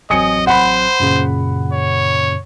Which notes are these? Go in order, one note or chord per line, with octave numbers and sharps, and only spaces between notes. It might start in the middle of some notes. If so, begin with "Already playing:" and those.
A1 F#3 C4 D#5 G#5 D#6 C#7
C5 F#5 B5
F#2 A#2 C#3
C#5